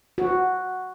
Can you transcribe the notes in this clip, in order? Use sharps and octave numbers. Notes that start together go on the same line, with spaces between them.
F#4